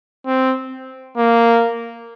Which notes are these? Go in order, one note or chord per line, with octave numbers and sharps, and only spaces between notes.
C4
A#3